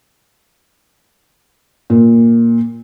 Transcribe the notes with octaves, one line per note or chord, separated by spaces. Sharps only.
A#2